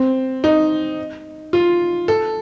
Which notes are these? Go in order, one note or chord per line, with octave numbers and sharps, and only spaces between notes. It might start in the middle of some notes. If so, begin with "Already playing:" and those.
Already playing: C4
D#4
F4
A4